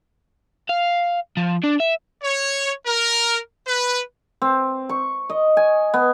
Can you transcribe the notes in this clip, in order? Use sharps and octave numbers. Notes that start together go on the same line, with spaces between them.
F5
F3
D4
E5
C#5
A#4
B4
C4
C#6
D#5
G#5
B3